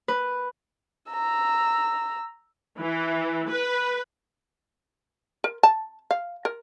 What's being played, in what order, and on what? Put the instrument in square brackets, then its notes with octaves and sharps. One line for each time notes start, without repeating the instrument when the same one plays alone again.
[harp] B4
[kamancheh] A#5 E6
[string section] E3
B4
[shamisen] A#4
A5
F5
A#4